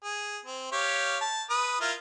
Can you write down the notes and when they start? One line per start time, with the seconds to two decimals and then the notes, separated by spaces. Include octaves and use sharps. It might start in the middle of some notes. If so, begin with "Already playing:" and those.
0.04 G#4
0.45 C4
0.72 G4 C#5 F5
1.21 A5
1.50 B4 D#6
1.81 E4 F4 A#4